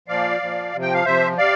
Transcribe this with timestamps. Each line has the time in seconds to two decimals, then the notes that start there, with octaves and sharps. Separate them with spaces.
0.08 A#2 F3 D5 F5
0.41 A#2 F3
0.73 C3 F3
0.82 G5
0.94 F5
1.05 C3 F3 C5 E5
1.38 C3 D5 F5